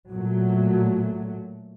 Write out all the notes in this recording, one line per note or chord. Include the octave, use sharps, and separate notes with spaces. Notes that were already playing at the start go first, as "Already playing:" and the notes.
A#2 F#3 A3